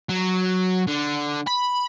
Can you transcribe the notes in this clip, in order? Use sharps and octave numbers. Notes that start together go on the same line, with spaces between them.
F#3
D3
B5